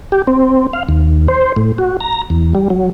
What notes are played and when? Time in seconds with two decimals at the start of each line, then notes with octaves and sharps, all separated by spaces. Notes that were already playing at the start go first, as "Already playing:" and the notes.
0.12 G4
0.27 C4
0.73 F5
0.89 D#2
1.28 C5
1.56 A2
1.78 F#4
2.01 A#5
2.30 E2
2.55 G3
2.70 F#3